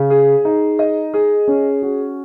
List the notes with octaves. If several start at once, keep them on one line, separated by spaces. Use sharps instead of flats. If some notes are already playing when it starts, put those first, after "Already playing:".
Already playing: C#3
G#4
D#4
D#5
G#4
C#4
F#4